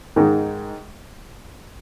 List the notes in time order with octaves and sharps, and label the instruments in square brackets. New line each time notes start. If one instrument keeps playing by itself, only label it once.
[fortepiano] G#2 D#3 G#3